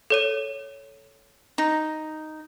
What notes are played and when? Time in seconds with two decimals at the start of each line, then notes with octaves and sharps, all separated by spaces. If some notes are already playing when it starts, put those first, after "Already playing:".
0.10 A4 C#5 D#7
1.58 D#4